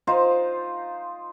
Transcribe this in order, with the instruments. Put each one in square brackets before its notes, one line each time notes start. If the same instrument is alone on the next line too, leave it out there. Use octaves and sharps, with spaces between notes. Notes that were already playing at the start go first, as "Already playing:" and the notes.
[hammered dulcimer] D#4 F4 C5